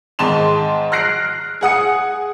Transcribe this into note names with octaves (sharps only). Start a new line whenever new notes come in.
G#2 D#3 A5 C6 E7
F6 F#6 A#6 C7 D7
G#4 F#5 D#6 C#7